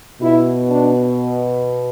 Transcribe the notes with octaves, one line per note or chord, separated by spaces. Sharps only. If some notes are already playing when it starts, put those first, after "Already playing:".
B2 E4
D4